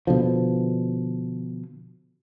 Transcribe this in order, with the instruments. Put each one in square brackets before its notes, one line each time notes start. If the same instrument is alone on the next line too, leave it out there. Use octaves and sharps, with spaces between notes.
[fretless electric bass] B2 D3 F3